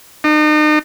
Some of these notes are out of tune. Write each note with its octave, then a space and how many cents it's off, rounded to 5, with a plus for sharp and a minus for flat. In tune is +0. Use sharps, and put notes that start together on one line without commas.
D#4 -40